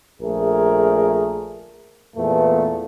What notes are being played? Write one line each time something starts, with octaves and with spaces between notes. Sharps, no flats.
A#1 A3 G#4 A#4
E2 A#2 A3 B3